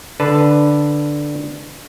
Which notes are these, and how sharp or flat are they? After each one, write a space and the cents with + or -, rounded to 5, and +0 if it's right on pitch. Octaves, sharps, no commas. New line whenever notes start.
D3 +0 B4 +0 A5 +0